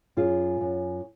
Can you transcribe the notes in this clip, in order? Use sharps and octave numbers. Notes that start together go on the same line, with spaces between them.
F#2 F4 G#4
F#2